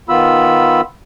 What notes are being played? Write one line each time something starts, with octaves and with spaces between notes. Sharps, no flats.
D#3 B3 F4 B5 E6